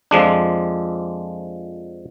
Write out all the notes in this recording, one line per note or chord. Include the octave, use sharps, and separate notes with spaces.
F2 F3 G#3 D4